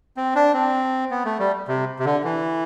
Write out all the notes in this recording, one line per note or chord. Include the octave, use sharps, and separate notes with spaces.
C4
D4
C4
B3
A3
G3
C3
C3
D3
E3